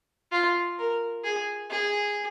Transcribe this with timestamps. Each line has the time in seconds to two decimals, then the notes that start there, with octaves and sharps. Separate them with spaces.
0.32 F4
0.79 A#4
1.24 G#4
1.70 G#4